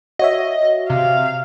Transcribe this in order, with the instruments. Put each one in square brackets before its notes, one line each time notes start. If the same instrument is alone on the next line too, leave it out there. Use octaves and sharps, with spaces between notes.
[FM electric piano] F#4 C#5 E5 [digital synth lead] D#5
[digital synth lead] C3 [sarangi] F5